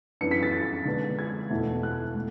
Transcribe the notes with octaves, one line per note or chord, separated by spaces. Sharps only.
F#2 E3 B3 D4 C#7
B6
A6
A6
D3 G#3 B3 D4
G#6
E2 B2 A3 E4
F#6
A3